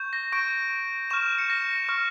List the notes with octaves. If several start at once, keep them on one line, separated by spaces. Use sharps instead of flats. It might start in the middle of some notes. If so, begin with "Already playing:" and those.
Already playing: C#6 G6
A#6
C#6 G6 D7
C#6 F6 E7
C#7
A#6
C#6 F6